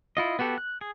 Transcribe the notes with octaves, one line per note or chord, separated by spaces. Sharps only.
E4 F4 D#5
B3 F#4 G4 A4
F#6
G#4